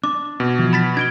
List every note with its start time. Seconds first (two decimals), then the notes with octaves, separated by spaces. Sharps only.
0.04 D4 D6
0.40 B2
0.59 E3 F3
0.73 B5 A6 B6
0.97 D4 D#4 G#6 D7 G7